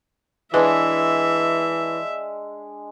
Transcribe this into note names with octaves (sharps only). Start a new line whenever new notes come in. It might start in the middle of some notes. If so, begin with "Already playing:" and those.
E3 G#3 D4 B4 E5